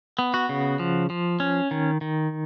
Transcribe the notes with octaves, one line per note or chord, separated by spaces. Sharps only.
B3
F#4
C#3
F3
F3
C#4
D#3
D#3